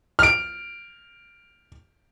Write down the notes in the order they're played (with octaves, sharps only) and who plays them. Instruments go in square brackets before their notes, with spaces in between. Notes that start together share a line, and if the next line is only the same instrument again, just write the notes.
[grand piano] F6 D7